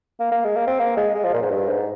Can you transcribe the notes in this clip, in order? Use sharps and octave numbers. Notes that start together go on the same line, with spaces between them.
A#3
A#3
G#3
A#3
C4
A#3
G#3
G#3
F3
A#2
G#2
G2
G#2